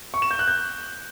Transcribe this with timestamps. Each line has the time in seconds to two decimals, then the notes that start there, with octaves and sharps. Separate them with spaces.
0.14 C#6
0.22 E7
0.31 G6
0.39 F#6
0.48 G6